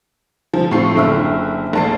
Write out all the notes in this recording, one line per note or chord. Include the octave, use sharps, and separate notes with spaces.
F3
A2 C4 F4 A4 C7
F#1 D3 E4 G5 E6 F6
A#1 A5 C7